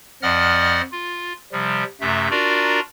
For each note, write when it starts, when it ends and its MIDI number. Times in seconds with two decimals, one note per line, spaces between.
0.22 0.81 41
0.22 0.81 53
0.22 0.81 74
0.22 0.81 75
0.22 0.81 78
0.22 0.81 89
0.92 1.33 65
1.52 1.84 48
1.52 1.84 53
1.52 1.84 55
2.01 2.28 42
2.01 2.28 48
2.01 2.28 57
2.01 2.28 76
2.31 2.80 62
2.31 2.80 65
2.31 2.80 66
2.31 2.80 70
2.31 2.80 74
2.31 2.80 82